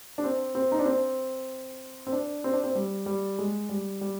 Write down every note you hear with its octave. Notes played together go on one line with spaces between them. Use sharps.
D4
C4
C4
D#4
D4
C4
C4
D4
C4
D4
C4
G3
G3
G#3
G3
G3